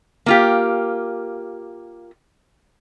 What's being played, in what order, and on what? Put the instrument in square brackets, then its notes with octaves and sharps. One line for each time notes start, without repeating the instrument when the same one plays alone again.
[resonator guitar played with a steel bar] A#3 F4 G4